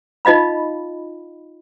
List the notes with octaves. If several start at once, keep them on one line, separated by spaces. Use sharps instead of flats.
D#4 F4 D#5 F5 B5